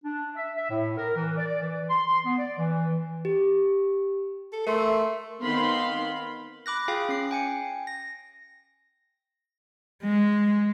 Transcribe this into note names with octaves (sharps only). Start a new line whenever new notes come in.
D4
E5
E5
A2
A#4
E3
D5
E3
C6
B3
D5
E3
G4
A4
A3 A#4 C6
D#3 B3 C4 F5 B5 C6
B5 D6 F#6 A#6
F4 G#4 F5 G5
C#4 C7
G5 G#5 C#7
A#6
G#3